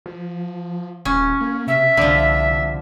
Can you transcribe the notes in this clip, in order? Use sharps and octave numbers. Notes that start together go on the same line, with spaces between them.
F3
D#1 C#4
A#3
C3 E5
C2 D3 F3